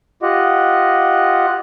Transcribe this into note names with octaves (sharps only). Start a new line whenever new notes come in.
F4 G4 D#5 F#5